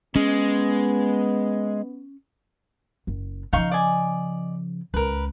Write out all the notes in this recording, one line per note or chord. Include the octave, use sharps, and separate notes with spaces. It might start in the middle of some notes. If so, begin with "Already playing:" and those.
G#3 B3 C#4
F#1
C#3 F3 D#4 F5 C#6
D5 D#5 G#5
C#2 A#4 B4